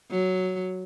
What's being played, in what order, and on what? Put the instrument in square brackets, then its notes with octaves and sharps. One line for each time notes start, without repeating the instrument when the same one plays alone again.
[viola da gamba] F#3